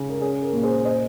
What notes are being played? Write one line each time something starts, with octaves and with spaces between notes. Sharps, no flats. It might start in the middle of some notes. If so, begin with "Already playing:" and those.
Already playing: C#3
A#4
C#4 G#4
A#4
A#2
G#4 C5
C5 D#5